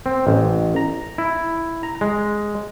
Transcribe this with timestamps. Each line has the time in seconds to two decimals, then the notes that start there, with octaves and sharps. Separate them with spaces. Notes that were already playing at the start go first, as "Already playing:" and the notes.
0.06 C4
0.27 A1
0.76 A#5
1.18 E4
1.83 A#5
2.01 G#3